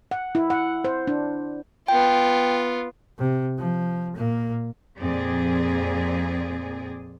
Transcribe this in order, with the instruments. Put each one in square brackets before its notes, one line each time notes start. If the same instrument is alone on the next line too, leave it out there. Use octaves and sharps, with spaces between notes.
[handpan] F#5
E4
F#5
C5
D4
[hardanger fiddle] B3 F4 [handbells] G5
[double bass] C3
F3
A#2 A#3
[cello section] F2 A#2 C4 G#4 D5